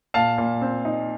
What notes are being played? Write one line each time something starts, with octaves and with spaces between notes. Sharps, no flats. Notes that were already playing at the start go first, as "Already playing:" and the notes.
A#2 F5 A5
A#2
C4
D#4